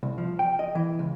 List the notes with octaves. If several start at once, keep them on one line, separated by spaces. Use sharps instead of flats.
C2
F3
G5
D#5
E3
C#2